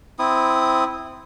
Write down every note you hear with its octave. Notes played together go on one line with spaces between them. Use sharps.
C4 E4 D#6